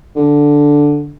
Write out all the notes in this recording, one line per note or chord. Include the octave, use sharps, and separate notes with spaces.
D3